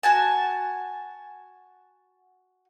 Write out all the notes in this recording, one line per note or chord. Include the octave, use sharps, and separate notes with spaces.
F#4 G#5 A5